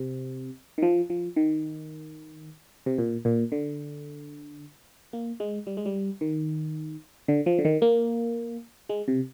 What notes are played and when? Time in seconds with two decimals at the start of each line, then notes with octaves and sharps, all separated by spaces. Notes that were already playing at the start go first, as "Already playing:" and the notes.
Already playing: C3
0.78 D#3
0.82 F3
1.10 F3
1.36 D#3
2.86 C3
2.98 A#2
3.25 A#2
3.52 D3
5.13 A#3
5.40 G#3
5.67 G3
5.77 G#3
5.86 G3
6.21 D#3
7.28 D3
7.46 F3
7.59 D3
7.65 D#3
7.82 A#3
8.89 G#3
9.08 C3